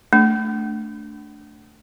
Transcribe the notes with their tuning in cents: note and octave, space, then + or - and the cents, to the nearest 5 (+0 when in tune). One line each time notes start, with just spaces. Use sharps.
A3 +0 D4 -10